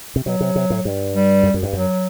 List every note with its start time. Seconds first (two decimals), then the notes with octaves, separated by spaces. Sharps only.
0.16 C3
0.25 B2 F#3
0.40 C3
0.56 C3
0.70 A2
0.85 G2
1.14 G3
1.43 F#2
1.54 F#2
1.63 G2
1.73 F#2 F#3